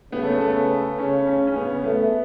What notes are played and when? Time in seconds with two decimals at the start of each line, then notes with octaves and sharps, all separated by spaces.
0.12 C#3 B3
0.22 A3
0.32 B3
0.41 A3
0.99 C#3 C#4
1.27 C#4
1.47 C#4
1.56 B3
1.84 A3 B3